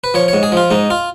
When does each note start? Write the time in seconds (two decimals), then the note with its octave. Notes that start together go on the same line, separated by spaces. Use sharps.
0.04 B4
0.14 F3 C#5
0.28 C#5
0.33 G#2
0.43 G#4
0.52 F3 F4
0.71 G#2 D#4
0.90 F4